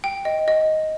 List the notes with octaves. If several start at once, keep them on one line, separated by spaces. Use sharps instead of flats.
G5
D#5
D#5